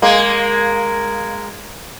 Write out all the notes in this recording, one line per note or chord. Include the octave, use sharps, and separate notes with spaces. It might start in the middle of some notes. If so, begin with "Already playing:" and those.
G#3 A#3